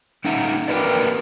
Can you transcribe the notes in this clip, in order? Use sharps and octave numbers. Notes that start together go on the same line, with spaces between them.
G3 C#4 D#4 E5 F#5 A#5
C4 G4 A#4 B4 D5